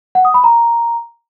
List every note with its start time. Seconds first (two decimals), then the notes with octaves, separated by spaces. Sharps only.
0.15 F#5
0.25 D#6
0.34 B5
0.44 A#5